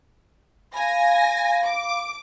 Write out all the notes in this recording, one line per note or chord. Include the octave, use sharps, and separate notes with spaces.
F5 G#5 B5 A#6
D6